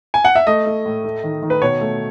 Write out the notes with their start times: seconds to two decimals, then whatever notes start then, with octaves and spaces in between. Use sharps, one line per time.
0.14 G#5
0.25 F#5
0.35 E5
0.47 A3 D#5
0.66 A3
0.86 A2
1.04 A3
1.24 D#3
1.43 D#3
1.50 B4
1.62 B2 C#5
1.81 A3